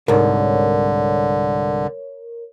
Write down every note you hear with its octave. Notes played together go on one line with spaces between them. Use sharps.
C2 G#2 D3 A#4 C#5